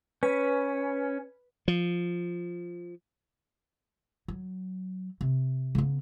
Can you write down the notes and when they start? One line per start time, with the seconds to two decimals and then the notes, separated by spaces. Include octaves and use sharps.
0.23 C#4 B4
1.68 F3
4.28 F#3
5.21 C3
5.75 C#3 B3